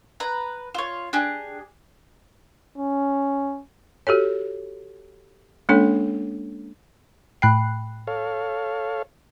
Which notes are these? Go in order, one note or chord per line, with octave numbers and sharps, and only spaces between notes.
B4 A#5
F4 C#5
D4 G4 G#4
C#4
F#4 G4 A4 C#5
G#3 A#3 C#4 D4 A4 C#5
A2 G5 B5 F#6 C7
A4 C#5 F5